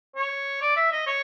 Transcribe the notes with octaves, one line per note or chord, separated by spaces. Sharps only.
C#5
D5
E5
D#5
C#5